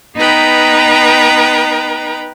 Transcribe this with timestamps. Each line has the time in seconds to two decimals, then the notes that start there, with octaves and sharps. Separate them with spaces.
0.15 B3 D#4 B4 G5 A#5